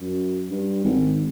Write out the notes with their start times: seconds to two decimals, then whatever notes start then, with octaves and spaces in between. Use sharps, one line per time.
0.01 F#2
0.50 G2
0.84 G#1